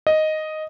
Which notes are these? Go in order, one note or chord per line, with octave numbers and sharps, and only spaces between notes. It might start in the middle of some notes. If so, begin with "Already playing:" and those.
D#5